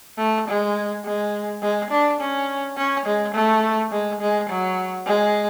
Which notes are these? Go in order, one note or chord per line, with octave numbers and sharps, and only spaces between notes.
A3
G#3
G#3
G#3
D4
C#4
C#4
G#3
A3
G#3
G#3
F#3
G#3